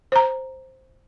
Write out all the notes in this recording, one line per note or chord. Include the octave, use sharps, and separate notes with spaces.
C5 A#5